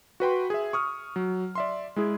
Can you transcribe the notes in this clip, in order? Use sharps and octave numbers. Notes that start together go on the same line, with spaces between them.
F#4 B4 G5 C6
G#4 E5
C#6 D#6 F6
F#3
D5 E5 C6
G#3 E4 G#4